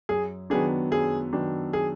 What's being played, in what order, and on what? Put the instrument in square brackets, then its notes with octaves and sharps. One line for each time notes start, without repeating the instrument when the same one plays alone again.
[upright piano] F#2 [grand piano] G#4
[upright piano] D#3 F#3 B3 D4 [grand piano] G#4
[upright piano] F#2 [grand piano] G#4
[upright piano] D#3 F#3 B3 D4
[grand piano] G#4